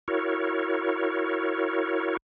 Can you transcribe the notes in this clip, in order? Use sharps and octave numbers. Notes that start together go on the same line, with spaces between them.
E4 F#4 A#4 C#5